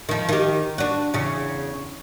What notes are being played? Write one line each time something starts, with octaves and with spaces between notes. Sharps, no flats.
D#3 F3
D#3 G4
D4 F#4
E2 C#3